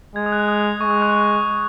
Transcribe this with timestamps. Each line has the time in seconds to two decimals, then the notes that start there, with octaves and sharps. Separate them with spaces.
0.16 G#3 G#6
0.26 D#6
0.32 F#6
0.48 D#6
0.81 G#3 C#6
0.91 D#6
1.02 F#6
1.12 C#6